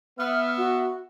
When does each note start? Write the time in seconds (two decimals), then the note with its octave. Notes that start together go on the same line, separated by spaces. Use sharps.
0.18 B3 E5 F6
0.57 F#4